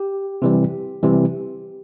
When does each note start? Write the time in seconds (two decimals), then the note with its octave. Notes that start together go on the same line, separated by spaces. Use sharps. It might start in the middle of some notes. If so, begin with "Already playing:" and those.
Already playing: G4
0.42 C3 E3 G3
1.03 C3 E3 G3